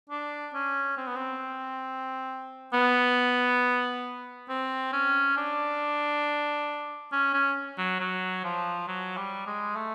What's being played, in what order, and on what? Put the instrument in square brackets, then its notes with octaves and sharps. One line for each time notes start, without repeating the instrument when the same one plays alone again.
[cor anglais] D4
C#4
C4
B3
C4
B3
C4
C#4
D4
C#4
C#4
F#3
F#3
F3
F#3
G3
G#3
A3